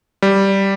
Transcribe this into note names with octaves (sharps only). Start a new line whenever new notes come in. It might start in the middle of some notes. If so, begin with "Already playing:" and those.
G3